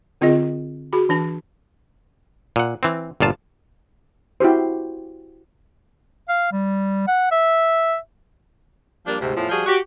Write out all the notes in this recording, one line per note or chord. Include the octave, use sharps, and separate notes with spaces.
D3 C4 F4 G#4 D#5
F#4 G#4 B5
E3 D4 A5
A#2 F#5
E3 C4
G1 A#2 F4 A5
E4 F#4 G4 C5
F5
G3
F#5
E5
F3 G3 A#3 D4
D2 G#2 C3
E2 A2 F3
F3 G3 F#4 G#4
F#4 G4